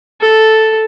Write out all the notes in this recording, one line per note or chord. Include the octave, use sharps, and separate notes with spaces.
A4